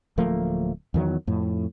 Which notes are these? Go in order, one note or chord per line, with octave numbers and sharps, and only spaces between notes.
D1 F3 A3 A#3
E2 D#3 F#3
F2 A2